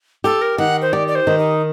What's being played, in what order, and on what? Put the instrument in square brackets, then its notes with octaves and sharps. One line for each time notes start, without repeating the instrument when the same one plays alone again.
[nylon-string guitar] G4 [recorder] A4
[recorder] A#4
[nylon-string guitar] D#3 [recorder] F#5
[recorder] C5
[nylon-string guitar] G4 [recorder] D5
[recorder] D5
C5
[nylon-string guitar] D#3
[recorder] D#4